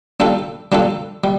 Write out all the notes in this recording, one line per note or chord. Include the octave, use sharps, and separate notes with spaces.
G3 D4 F4 A4
G3 D4 F4 A4
G3